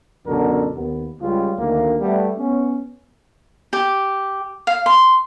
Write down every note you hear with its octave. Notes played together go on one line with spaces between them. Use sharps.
C#2 F#2 B2 D3 A4 A#4
D#2 B3
C#2 G3 F4
D2 D#3 A#3
G3 A3 B3
B3 C#4
G4
F5
C6